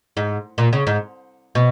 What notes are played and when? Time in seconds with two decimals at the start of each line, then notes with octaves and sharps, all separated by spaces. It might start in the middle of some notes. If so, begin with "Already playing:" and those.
0.17 G#2
0.58 A#2
0.73 C#3
0.87 G#2
1.55 B2